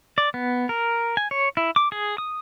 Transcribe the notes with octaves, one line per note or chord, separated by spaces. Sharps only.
D5
B3
A#4
G#5
C#5
E4
D6
G#4
D#6